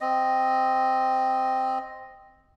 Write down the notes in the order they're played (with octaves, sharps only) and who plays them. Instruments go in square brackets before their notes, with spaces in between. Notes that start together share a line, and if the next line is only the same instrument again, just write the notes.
[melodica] C4 D#5